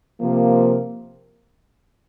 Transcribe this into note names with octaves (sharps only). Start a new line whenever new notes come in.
C3 F3 A#3